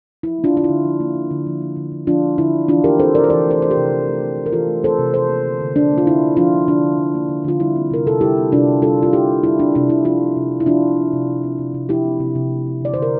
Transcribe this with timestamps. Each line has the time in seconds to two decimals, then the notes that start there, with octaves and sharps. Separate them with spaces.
0.23 F3 E4
0.39 A#3
0.44 D4 F4
0.54 D3 F4
0.64 D3 E4
0.85 F3
1.00 A#3
1.15 D3
1.31 D3
1.47 F3
1.62 A#3
1.77 D3
1.92 D3
2.07 F3 D4 F4
2.23 A#3
2.38 D3 E4
2.53 D3
2.68 E3 D4 F4
2.84 A3 G4 A#4
2.99 C4 A4 C5
3.15 C3 A#4 D5
3.24 C5
3.30 E3 A#4 D5
3.45 A3
3.51 A4 C5
3.61 C4 C5
3.71 G4 A#4
3.77 C3
3.92 E3
4.07 A3
4.23 C4
4.38 C3
4.46 A#4
4.52 E3 F4 A4
4.68 A3
4.83 C4 A4 C5
4.99 C3
5.14 F3 A4 C5
5.29 A#3
5.45 D3
5.60 D3
5.75 F3 D4
5.92 A#3
5.98 F4
6.06 D3 E4
6.22 D3
6.37 F3 D4 F4
6.52 A#3
6.67 D3 D4
6.83 D3
6.98 F3
7.14 A#3
7.29 D3
7.44 D3 F4
7.60 G3 E4
7.76 C4
7.91 C3 A#4
8.06 C3 A4
8.21 G3 E4 G4
8.37 C4
8.52 C3 D4 F4
8.67 C3
8.82 G3 F4 A4
8.98 C4 F4
9.13 C3 E4 G4
9.29 C3
9.43 G3 E4
9.59 C4 D4
9.75 C3 D4
9.89 C3 E4
10.05 F3 D4 F4
10.21 C4
10.36 C3
10.51 C3
10.60 E4
10.66 F3 D4 F4
10.83 C4
10.97 C3
11.13 C3
11.28 F3
11.44 C4
11.59 C3
11.74 C3
11.89 F3 E4 G4
12.05 C4
12.20 C3
12.35 C3
12.51 A3
12.67 C4
12.81 D3 D5
12.94 D3 C5
13.02 A#4